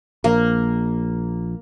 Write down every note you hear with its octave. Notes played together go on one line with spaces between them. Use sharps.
A#1 A#3